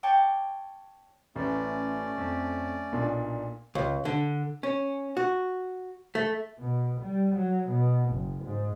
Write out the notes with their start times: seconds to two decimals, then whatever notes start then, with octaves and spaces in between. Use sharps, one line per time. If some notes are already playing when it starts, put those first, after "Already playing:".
0.03 C#5 G5 A5 D6
1.36 A1 A3 C#4 D5
2.18 F2
2.92 B1 A#2 D4
3.75 C#2
4.05 D3
4.63 C#4
5.17 F#4
6.15 A3
6.58 B2
7.01 G3
7.35 F#3
7.69 B2
8.10 F#1
8.44 G#2